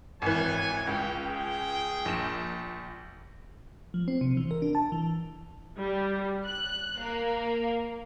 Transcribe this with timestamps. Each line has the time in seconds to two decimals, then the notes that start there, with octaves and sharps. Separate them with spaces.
0.22 G#1 E3 C#5 G#5
0.87 C#2 G#4 G5
1.24 G#4 G5
2.05 A#1 E7
3.94 F3
4.08 C4
4.21 C3
4.37 E3
4.51 A#4
4.62 D4
4.75 A5
4.92 E3
5.77 G3
6.47 F#6
7.02 A#3